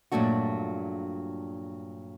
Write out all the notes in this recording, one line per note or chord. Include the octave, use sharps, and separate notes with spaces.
G2 A#2 F#3 A3 D4 F#4